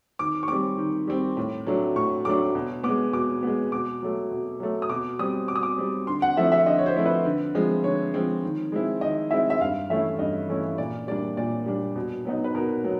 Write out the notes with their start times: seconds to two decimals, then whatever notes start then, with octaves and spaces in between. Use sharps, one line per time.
0.19 D#3 D6
0.43 C#6
0.48 G3 C4 D6
0.78 D#3
1.07 G3 C4
1.37 A2
1.67 F#3 A3 D4
1.96 A2 C#6
2.25 F#3 A3 D4 D6
2.55 B2
2.83 G#3 B3 D6
3.13 B2 D6
3.43 G#3 B3
3.72 B2 D6
4.02 F#3 A3
4.31 B2
4.60 F#3 A3
4.82 D#6
4.89 B2 D6
5.19 G3 C4 D#6
5.48 B2 D6
5.56 D#6
5.63 D6
5.78 G3 C4
6.07 D3 C6
6.22 F#5
6.37 F3 A3 C4 E4 E5
6.52 E5
6.66 D3 D#5
6.78 C#5
6.86 C5
6.96 F3 A3 C4 E4
7.06 B4
7.25 D3
7.55 F3 G#3 C4
7.84 D3 C#5
8.14 F3 G#3 C4
8.43 D#3
8.72 G#3 C4 E4
9.01 D#3 D#5
9.31 G#3 C4 E4 E5
9.50 E5
9.61 G2 F5
9.90 E3 A3 C#4 E4 E5
10.19 G2 D#5
10.49 E3 A3 C#4 E4
10.78 A#2 D5
11.07 G3 A#3 D4 D5
11.37 A#2 D5
11.66 G3 A#3 D4
11.96 B2
12.25 F#3 B3 D#4
12.44 B4
12.55 B2 A#4
12.84 F#3 B3